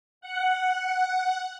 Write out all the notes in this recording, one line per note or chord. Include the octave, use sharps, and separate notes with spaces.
F#5